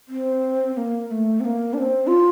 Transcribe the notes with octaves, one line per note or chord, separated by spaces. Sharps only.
C4
C4
A#3
A#3
A3
C4
A#3
D4
C4
F4